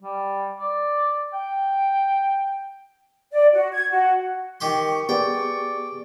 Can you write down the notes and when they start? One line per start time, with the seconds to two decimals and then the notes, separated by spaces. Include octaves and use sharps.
0.02 G3
0.58 D5
1.33 G5
3.32 D5
3.53 F#4
3.72 G#6
3.91 F#4
4.60 D#3 G4 C6 C#6
5.09 B3 G4 G#4 D5 G5